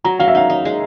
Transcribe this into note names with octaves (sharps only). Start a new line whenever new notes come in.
F#3 A#5
F#3 F5
E5
D#4 F5
D#4
G#3